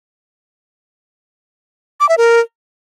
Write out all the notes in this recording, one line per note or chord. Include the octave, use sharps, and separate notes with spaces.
D6
E5
A#4